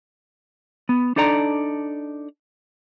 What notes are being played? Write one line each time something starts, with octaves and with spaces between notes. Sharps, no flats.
B3
D4 D#4 A4 D5 A#5